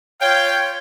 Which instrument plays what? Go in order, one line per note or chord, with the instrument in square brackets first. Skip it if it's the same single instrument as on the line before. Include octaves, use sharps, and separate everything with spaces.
[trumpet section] F4 F5 G5 [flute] C#5